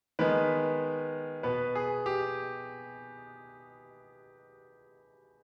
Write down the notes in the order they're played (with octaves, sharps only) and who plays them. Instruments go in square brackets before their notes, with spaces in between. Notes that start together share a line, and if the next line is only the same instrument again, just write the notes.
[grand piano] D#3 G#3 B3 B4
B2 B3 B4
G#4
G4